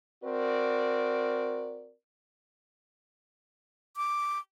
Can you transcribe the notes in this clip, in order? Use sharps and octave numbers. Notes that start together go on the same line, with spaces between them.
C4 F#4 A#4 D5
D6